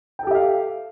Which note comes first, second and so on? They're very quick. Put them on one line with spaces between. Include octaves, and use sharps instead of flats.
G5 A4 G4 E5 F5